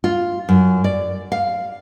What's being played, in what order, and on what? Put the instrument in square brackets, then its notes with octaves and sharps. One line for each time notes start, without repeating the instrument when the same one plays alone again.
[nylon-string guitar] F4
F#2
D5
F5